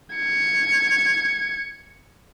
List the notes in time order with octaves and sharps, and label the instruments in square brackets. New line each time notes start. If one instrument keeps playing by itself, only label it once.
[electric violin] G#6 C#7